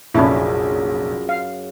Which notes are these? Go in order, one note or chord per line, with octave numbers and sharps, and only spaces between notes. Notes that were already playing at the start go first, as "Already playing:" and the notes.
F1 A#1 F#2 C#3 C#4 D4 E4 A5
F5